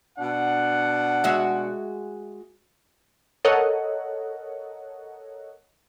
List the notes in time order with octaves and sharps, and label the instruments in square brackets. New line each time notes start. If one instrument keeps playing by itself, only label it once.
[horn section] B2 D4 F#5
[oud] G#3 F#4 E5
[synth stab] A4 A#4 C#5 D#5 F#5